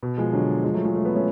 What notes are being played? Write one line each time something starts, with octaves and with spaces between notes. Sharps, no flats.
B2
F3 G#3
D3 F#3
F3 G#3
F#3 A3
F3 G#3
F#3 A3
G#3 B3
A3 C#4